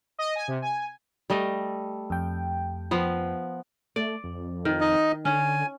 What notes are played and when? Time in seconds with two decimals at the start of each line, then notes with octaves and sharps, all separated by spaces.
0.18 D#5
0.36 G#5
0.48 C3
0.62 G#5
1.30 G3 A3 D#5
2.10 F2 G5
2.91 F3 B3
3.96 A3 D5
4.24 F2
4.65 D#3
4.81 D#4 D#5
5.25 D3 C#4 G#5